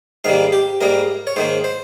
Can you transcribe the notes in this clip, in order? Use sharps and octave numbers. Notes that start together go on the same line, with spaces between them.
G#2 D#3 G3 A#3 F5
G4
G#2 G3 A#3 A#4
C#5
G#2 D#3 A#3 C5
C5